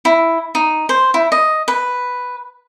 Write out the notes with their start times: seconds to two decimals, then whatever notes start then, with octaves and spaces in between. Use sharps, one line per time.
0.05 E4
0.55 D#4
0.89 C5
1.14 E4
1.32 D#5
1.68 B4